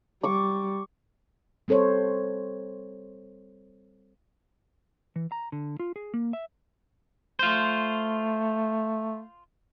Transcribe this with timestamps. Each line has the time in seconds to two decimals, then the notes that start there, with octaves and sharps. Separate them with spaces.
0.23 G3 C#6 D6
1.68 G3 C4 A4 C5 C#5
5.16 E3
5.32 A#5
5.52 D3
5.80 F4
5.96 G#4
6.14 A#3
6.33 E5
7.39 A3 F4 C5